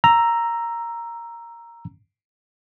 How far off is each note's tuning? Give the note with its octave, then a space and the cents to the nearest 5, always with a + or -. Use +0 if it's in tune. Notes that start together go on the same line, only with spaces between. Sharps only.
A#5 +0 E6 +10